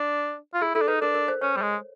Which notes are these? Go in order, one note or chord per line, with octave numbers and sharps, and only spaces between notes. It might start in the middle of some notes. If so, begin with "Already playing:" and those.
Already playing: D4
F4
E4 G#4
E4 A4
D4
D#4 B4
D4 A#4
A#4
C5
C#4 C#5
G3
G#3